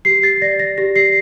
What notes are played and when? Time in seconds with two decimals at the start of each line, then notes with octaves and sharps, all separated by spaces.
0.05 G4 C7
0.23 A6
0.42 D5 A#6
0.60 A#6
0.78 G4 A#6
0.96 C7